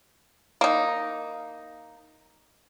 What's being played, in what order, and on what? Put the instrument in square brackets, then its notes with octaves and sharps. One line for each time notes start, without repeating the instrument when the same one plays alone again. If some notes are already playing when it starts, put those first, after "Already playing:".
[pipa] A#3 D#4